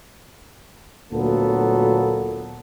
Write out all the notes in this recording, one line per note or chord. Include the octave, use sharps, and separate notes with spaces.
D2 A#2 F#3 B3 A4